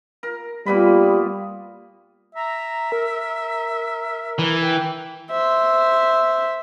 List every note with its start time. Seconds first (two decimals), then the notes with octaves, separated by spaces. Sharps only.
0.23 A#4
0.66 A#2 G3 B3 B5
2.35 E5 A#5
2.92 A#4
4.39 E3
4.62 G5
5.30 C5 E5